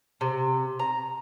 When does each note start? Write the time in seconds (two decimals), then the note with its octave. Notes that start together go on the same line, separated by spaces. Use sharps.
0.21 C3
0.80 A#5